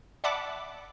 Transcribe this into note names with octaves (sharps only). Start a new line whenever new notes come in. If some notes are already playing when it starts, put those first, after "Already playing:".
D5 E5 F#5 A5 B5 D6